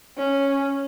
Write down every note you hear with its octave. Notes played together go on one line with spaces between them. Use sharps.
C#4